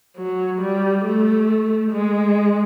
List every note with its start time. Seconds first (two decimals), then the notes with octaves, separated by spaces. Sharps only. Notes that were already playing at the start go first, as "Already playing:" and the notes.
0.17 F#3
0.61 G3
1.04 A3
1.92 G#3